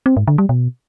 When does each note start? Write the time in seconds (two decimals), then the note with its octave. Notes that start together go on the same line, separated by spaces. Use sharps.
0.06 C4
0.17 G#2
0.27 D3
0.38 G3
0.49 B2